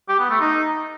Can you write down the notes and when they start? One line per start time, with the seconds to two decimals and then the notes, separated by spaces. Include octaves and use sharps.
0.09 G4
0.19 B3
0.30 A3
0.41 D#4